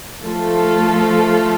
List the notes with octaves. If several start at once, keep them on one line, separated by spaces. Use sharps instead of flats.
F3 A3 F4 A4